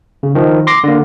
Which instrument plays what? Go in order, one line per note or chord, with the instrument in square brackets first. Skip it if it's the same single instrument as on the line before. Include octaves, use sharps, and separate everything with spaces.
[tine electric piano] C#3
D#3 F3
C6 D6 A#6 C7
D3 A#3